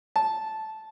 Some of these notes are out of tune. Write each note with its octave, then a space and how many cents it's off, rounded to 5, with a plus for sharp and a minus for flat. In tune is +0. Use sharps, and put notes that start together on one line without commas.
A5 -10